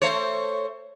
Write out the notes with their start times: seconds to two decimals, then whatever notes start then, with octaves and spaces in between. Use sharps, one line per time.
0.02 A3 C5 C#5